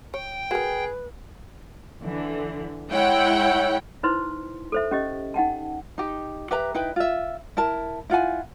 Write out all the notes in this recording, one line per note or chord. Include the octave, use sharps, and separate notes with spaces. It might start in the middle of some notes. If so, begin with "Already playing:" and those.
C#5 G5
F#4 G#4 A#4 B4
D3 E3
G#3 E4 C#5 F#5 G5
D#4 E4 B4 C5 C6
A4 C5 E5
C#4 G4 D#5
D#4 F#5 G5 A5
D#4 G4
G4 B4 E5 A#5
D#4 E4 B4 G5
F4 E5
E4 A#4 A5
E4 F4 F#5 G#5